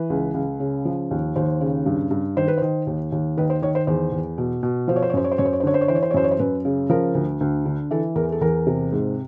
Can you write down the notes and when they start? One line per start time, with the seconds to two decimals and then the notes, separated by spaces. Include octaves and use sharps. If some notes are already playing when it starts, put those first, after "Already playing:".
Already playing: E3 B4
0.10 C#2
0.34 C#2
0.60 C#3
0.85 F3
1.11 D#2
1.36 D#2 C5
1.61 C#3
1.86 G2
2.11 G2
2.36 D#3 C5
2.48 B4
2.58 D#3 C5
2.87 D#2
3.12 D#2
3.37 D#3 B4
3.50 C5
3.62 D#3 C#5
3.75 C5
3.87 E2 C5
4.12 E2
4.38 B2
4.63 B2
4.88 F3 C5
4.96 C#5
5.02 C5
5.10 C#5
5.14 F#2 C5
5.24 C#5
5.32 C5
5.38 F#2 C#5
5.45 C5
5.53 C#5
5.60 C5
5.63 D3 C#5
5.74 C5
5.81 C#5
5.88 E3 C5
5.95 C#5
6.02 C5
6.11 C#5
6.14 F#2 C5
6.24 C#5
6.31 C5
6.39 F#2 B4
6.65 C#3
6.90 F3 A#4
7.15 D2
7.41 D2
7.66 D3
7.91 E3 A4
8.16 E2 A#4
8.32 A4
8.41 E2 A#4
8.67 C3
8.92 G#2